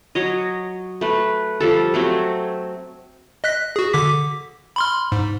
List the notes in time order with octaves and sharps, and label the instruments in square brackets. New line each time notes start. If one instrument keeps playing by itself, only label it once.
[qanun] F#3 C#5 D#5
A3 B4
F3 G3 A4
F#3 A3 C4
[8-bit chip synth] D#5 F#6 B6
F#4 G#4
D3 D6 B6
B5 C6 F6
G#2